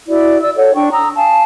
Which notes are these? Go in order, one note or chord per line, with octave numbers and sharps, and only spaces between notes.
E4 F#4 D5
D5 E6
A4 C#5 F#5
D4 G5 C#6
A#5 D#6 E6
F5 G#5 A5